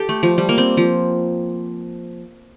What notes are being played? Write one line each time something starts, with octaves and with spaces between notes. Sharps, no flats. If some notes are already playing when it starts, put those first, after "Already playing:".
Already playing: G4 A4
A3
F3
G3
A#3
C4
F3